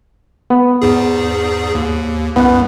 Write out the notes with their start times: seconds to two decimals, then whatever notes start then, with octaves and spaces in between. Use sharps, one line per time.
0.50 B3
0.82 E2 G#2 G#4
1.75 D#2
2.36 C2 F#2 B3 F#5